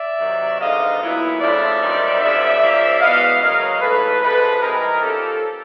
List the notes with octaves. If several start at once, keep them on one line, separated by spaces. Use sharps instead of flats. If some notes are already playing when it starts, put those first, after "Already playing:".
Already playing: D5 E5
C3 D#3 F#3
D3 F3 G#3 B3 D#4 D#5 F5
A#2 F#3 B3 E4
C#3 F3 A3 D4 F4 D5 E5
F#2 D#3 G3 C4 D#4
F#2 C#3 F3 D5 E5
G#2 F3 A#3 C#4
B2 G#3 B3 E4 D#5 F5
C#3 F#3 A#3 C#4 D#5 F5
G#2 E3 A3 A4 B4
C3 F3 G#3 A4 B4
E3 G3 C4 D#4 G#4 A#4
F3 A#3 C#4 G4 A4